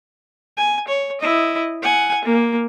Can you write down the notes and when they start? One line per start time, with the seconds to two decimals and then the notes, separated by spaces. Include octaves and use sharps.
0.57 G#5
0.88 C#5
1.21 E4 D#5
1.82 F#5 G#5
2.25 A#3